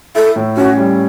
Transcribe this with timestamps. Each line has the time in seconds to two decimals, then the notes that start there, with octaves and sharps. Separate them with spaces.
0.15 E4 A4
0.36 A2
0.57 C#4 F#4
0.77 G3